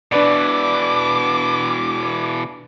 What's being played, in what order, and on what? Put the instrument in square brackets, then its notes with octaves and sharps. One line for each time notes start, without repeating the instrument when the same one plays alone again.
[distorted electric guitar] B2 E3 [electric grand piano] D4 B4 D5 [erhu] D6